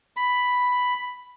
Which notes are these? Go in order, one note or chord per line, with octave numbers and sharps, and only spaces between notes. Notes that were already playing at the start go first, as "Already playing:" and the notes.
B5